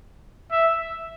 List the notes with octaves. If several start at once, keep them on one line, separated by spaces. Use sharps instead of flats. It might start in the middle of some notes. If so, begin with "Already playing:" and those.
E5